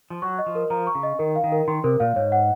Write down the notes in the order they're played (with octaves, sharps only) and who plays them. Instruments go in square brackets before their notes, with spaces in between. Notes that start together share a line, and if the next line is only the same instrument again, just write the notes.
[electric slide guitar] F3
[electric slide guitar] F#3 [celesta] C#6
[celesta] D#5
[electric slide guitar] F3
[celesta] A#4
[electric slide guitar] F3 [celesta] A#5
[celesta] C#6
[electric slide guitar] C#3
[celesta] D#5
[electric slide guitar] D#3 [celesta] A#4
[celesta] F5
[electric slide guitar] D#3
[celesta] A#4
[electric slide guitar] D#3 [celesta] C6
[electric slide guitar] C3 [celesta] A#4
[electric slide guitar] A#2 [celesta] F5
[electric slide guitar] G#2 [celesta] C#5
[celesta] F#5